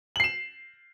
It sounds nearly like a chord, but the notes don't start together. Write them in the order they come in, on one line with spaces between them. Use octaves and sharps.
F#7 C7 E7